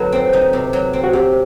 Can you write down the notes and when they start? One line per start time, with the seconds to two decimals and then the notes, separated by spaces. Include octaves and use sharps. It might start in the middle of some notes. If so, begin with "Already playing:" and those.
Already playing: C3 F#3 D#4 A4 B4
0.12 C4
0.33 D#4
0.53 C3
0.73 F#3
0.93 C4
1.04 F#4
1.13 C3 G4